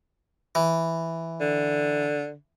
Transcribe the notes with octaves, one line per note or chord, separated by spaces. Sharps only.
E3
D3